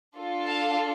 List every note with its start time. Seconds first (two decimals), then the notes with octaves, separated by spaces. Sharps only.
0.15 D4 F4 A4
0.46 F5 A5